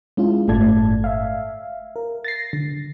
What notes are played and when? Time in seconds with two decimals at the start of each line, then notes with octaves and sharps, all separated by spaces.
0.17 G#3 C#4 E4 F4
0.48 G1 A2 A3 D5 A5 G#6
1.04 E5 F5
1.96 A#4
2.24 A6 A#6 C7
2.53 D3